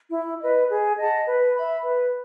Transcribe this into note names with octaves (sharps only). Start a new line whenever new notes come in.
E4
B4 D#5
G#4
D#5 F#5 A5
B4
E5 B5
B4